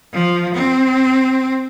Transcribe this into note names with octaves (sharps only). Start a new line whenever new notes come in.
F3
C4